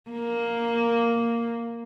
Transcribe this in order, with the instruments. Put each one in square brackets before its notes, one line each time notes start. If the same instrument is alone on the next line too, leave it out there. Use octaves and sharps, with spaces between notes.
[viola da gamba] A#3